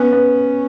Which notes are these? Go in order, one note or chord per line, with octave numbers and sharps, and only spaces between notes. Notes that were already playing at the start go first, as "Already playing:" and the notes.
Already playing: B3 C#4
B3